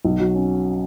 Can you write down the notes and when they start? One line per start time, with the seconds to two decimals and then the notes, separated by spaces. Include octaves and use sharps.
0.05 B1
0.19 F#3
0.35 C#4